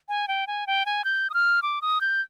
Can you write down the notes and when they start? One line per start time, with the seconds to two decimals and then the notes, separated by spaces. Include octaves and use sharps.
0.09 G#5
0.28 G5
0.47 G#5
0.67 G5
0.86 G#5
1.05 G6
1.30 D#6
1.34 F6
1.62 D6
1.82 D#6
2.01 G6